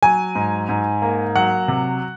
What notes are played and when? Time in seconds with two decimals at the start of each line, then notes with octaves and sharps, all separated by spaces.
0.02 F#3 G#5
0.35 G#2
0.69 G#2
1.02 A#3
1.36 F#3 F#5
1.68 C3